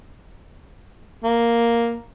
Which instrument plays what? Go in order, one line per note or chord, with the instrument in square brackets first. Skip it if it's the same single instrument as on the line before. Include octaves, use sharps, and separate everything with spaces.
[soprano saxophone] A#3